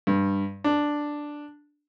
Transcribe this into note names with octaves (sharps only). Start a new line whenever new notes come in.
G2
D4